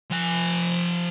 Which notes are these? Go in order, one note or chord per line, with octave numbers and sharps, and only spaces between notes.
F3 G#5